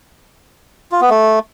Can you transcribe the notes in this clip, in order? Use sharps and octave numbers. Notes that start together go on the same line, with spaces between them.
F4
B3
A3